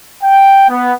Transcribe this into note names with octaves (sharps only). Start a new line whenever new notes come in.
G5
B3